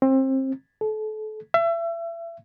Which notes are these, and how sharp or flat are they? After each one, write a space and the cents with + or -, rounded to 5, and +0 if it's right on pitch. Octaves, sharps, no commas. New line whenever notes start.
C4 +25
A4 -30
E5 +30